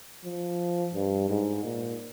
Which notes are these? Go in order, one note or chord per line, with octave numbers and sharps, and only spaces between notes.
F3
G2
G#2
A#2